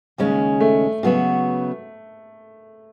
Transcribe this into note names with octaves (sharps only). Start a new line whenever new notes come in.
D#2 C#3 G#3 C#4
A3
C#3 F#3 B3 F#4